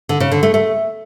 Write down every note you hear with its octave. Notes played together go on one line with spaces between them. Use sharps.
D3
C#3
D3
A3
A3